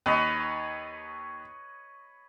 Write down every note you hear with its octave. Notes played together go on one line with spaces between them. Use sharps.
D#2 B4 C#5 D#5